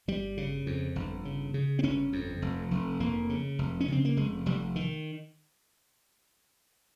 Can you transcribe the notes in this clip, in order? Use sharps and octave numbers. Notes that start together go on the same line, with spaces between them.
G1 G3
C#3
F2
G1
C#3
C#3
C4
G1 C#4
F2
F1
F1
F1 A#3
C#3
F1
C#4
C#3 C4
A#3
F1 G#3
F1 G3
D#3